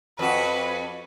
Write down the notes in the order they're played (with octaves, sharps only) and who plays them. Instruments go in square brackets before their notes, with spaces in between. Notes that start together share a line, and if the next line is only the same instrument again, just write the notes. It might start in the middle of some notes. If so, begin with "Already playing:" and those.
[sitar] F2 F#4 [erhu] B4